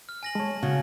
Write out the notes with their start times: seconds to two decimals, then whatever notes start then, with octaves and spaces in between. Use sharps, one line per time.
0.09 F6
0.23 G#5 A#6 F#7
0.35 G#3 C#5 A5
0.63 C#3 F#4